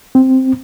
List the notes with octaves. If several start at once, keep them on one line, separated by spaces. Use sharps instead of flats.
C4